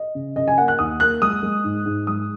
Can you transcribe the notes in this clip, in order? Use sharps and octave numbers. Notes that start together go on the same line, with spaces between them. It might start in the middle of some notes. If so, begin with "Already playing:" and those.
Already playing: D#5
C#3
C#3 D#5
G#5
A#3 F#5
F#6
D#2 D#6
A#3 F#6
G#3 D#6
G#3
G#2
G#2
G#3 D#6